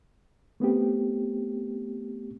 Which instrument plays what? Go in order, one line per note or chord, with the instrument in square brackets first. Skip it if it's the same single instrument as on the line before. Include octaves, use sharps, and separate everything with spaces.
[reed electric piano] A3 B3 C4 G4